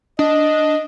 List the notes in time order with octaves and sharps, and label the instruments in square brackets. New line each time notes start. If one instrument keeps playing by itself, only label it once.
[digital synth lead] D4 [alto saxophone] D#5